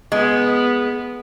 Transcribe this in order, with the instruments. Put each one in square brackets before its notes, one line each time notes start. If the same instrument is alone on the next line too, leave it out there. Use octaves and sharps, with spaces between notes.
[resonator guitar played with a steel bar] G#3 [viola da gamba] B3